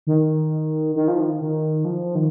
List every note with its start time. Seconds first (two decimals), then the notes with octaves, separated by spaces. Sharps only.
0.07 D#3
0.96 D#3
1.08 F3
1.20 D#3
1.41 D#3
1.85 F3
2.15 D#3